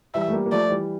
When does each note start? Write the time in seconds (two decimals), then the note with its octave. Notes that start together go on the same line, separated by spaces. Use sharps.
0.14 E3 G3 E5
0.28 A3
0.33 G3 A#3
0.46 A#3
0.52 F3 A3 D5
0.70 E3 G3